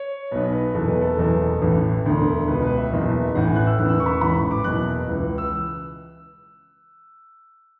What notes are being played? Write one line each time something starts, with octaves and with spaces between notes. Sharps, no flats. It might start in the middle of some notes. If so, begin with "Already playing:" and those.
Already playing: C#5
B1 B2 B4
B4
F#1 E2 B2 A4
B4
A4
F#1 E2 B2
A1 A2 E3
E1 D2 D3
C#2 B2 B4
B4
E5
F#1 E2 B2
A1 A2 E3 F#5
G#5
F#6
E6
E1 E2 C#3 E3 F#6
E6
C#6
B5
C#6
A1 G#2 E3 B5
D6
F#1 E2 B2 F#6
C#2 C#3 E3
E6